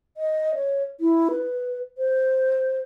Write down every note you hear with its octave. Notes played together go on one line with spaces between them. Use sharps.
D#5
C#5
E4
B4
C5